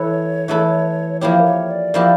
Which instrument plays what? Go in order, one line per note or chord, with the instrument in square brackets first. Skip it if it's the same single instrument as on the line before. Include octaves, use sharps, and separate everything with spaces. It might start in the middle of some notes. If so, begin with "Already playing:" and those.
Already playing: [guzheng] E3 A3 E4 A4 [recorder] C#5
[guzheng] E3 A3 E4 A4
[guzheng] F3 A#3 E4 G4 [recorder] C#5
[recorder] A#4
C#5
D5
[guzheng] F3 A#3 E4 G4